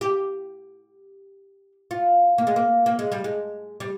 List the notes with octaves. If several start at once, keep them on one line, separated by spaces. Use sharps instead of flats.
G4
F4
A#3
G#3
A#3
A#3
G#3
G3
G#3
G3